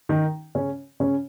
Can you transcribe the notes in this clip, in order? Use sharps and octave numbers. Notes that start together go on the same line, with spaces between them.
D#3 D#4
C#3 C#4
C#3 C#4